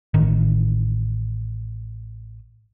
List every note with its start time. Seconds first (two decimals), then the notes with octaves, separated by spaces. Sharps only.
0.14 A1 D#3